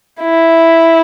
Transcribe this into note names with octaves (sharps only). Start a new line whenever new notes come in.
E4